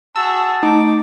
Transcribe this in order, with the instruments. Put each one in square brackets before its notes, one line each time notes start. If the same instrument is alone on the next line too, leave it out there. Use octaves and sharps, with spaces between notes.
[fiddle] F#4 G#4 [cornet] A5 [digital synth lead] E6
[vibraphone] A3 [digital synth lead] D#4 [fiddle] D6